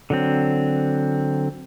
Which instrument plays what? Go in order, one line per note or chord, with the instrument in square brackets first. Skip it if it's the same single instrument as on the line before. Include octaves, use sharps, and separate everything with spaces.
[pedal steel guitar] D3 F#3 C4